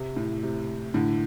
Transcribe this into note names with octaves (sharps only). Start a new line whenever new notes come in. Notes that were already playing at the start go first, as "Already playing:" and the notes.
Already playing: C3
A2
C3
A2 D3